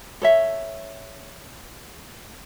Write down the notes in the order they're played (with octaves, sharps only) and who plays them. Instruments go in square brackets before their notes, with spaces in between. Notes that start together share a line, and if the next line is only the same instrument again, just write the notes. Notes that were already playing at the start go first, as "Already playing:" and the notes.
[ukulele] A4 C#5 E5